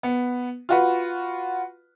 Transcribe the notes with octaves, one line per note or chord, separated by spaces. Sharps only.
B3
F4 F#4 B4